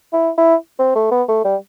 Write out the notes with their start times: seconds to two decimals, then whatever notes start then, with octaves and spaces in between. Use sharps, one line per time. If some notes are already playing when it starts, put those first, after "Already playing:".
0.13 E4
0.38 E4
0.79 C4
0.95 A3
1.11 B3
1.28 A3
1.44 G3